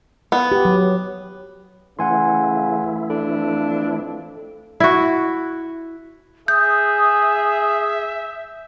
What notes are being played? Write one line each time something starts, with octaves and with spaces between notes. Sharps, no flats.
B3
G4
F#3
C#3 E3 A3 E4 F#5 G#5 C6
F2 D4 A4
E4 F#4
G#4 E5 D#6 G6